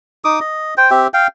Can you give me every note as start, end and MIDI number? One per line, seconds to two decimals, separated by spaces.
0.25 0.39 63
0.25 0.39 86
0.25 0.39 87
0.40 0.74 75
0.77 0.91 72
0.77 0.91 79
0.91 1.07 60
0.91 1.07 67
0.91 1.07 76
1.14 1.27 77
1.14 1.27 79